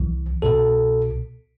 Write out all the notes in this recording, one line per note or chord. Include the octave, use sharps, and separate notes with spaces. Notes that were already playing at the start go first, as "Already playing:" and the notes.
Already playing: C2 E3
C2 B2 A4